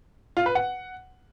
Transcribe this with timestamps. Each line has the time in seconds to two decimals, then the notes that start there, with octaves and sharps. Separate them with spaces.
0.37 F4
0.46 B4
0.55 F#5